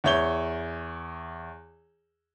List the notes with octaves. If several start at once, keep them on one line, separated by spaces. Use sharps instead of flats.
E2 E4 C#5 G6 G7